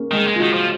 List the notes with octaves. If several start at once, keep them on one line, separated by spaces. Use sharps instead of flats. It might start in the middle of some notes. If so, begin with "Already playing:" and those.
Already playing: A#3 C#4
D#3 G#3
G#3
F4
D#3 F#4
F3